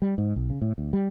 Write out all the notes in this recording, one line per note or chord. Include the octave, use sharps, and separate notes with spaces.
G3
G#2
B1
C#3
A2
D2
G3